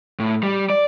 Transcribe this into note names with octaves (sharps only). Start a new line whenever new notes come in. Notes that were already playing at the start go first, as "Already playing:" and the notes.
A2
G3
D5